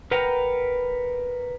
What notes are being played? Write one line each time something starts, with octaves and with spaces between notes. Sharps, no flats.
A#4 B4 F#5 G5 A#5